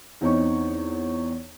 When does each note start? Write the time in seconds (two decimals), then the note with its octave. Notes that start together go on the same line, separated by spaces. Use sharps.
0.21 E2 C4 D#4 C#5 C#6